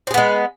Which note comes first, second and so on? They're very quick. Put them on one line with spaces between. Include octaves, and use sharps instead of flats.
C4 G#4 B3 G#3